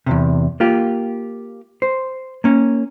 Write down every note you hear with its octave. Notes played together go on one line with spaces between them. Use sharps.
E2 A2 C3
A#3 F4 G4
C5
A#3 C#4